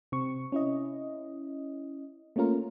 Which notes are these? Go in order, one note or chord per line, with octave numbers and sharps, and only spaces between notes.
C3 C4 C#6
C#4 E4 D#5
A3 A#3 C#4 F4 A#4